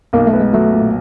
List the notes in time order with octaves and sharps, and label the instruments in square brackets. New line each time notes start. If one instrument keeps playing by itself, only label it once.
[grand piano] B1 [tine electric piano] A#3
[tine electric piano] A3
[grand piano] B3
[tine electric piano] G#3
[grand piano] F#3 [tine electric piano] A3
[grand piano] A#2